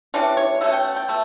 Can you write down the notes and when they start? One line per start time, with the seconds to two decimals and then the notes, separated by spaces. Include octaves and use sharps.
0.14 E3 G3 C#4 D4
0.37 C#5
0.61 B2 A3 C#4 E5
0.72 G5
0.84 F#5
0.96 G5
1.08 B2 A3 E5